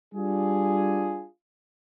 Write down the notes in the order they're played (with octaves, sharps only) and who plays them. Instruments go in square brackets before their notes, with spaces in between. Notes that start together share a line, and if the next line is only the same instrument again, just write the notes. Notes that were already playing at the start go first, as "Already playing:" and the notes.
[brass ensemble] G3 D4 F4 G#4